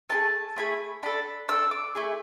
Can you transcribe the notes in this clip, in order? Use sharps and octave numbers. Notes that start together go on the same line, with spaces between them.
A3 E4 G#4 A5
A3 E4 G#4 B5
D4 A4 B5
D4 A4 E6
D6
A3 E4 G#4